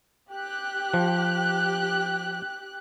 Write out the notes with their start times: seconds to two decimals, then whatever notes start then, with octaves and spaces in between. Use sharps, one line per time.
0.32 G4 F#6
0.94 F3